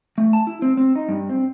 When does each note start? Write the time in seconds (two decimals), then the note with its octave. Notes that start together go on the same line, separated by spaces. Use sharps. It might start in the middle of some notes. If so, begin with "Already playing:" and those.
0.18 A3
0.33 A5
0.47 E4
0.62 C4
0.77 C4
0.96 D#4
1.08 G2
1.30 C4